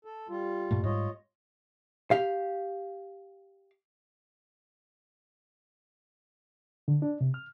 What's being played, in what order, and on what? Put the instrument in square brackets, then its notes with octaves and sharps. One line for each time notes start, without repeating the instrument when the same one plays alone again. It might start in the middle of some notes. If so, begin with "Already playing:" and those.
[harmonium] A4
G3 F4
[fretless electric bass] G2 A#2 A3
[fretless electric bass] G#2 G3 [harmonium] F4 C#5 D#5
[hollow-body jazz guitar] G4 F5
[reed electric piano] D3
D4
C3
F6